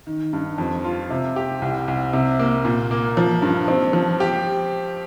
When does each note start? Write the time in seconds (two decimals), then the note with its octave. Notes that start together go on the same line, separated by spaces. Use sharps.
0.07 D#3
0.33 G2
0.58 F2
0.84 F4
1.10 C3
1.36 G4
1.62 C2
1.88 C2
2.13 C3
2.39 A#3
2.65 A#2
2.91 A#3
3.17 F3
3.42 G2
3.68 C4
3.93 F3
4.20 G4